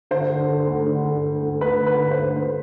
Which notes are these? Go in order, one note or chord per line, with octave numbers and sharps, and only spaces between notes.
D3 C5
D3
D3
D2
D3
D3
D3
D2
D2 B4
D3
B4
D3
C5
D2
D2 B4